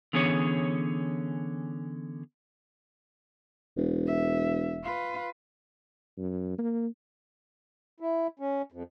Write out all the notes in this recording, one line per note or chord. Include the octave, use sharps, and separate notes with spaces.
D3 E3 B3 C#4 G#4 C#5
E1
E5
F4 B4
F#2
A#3
E4
C#4
F2